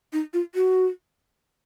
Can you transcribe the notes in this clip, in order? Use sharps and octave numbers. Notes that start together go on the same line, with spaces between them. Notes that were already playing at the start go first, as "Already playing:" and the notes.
D#4
F4
F#4